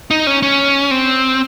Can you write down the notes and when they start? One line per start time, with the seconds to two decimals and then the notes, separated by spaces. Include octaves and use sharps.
0.11 D#4
0.27 C#4
0.43 C#4
0.91 C4